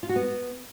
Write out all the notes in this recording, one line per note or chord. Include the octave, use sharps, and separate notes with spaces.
F4
F#4
B3